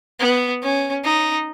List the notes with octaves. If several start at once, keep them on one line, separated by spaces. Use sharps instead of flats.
B3
C#4
D#4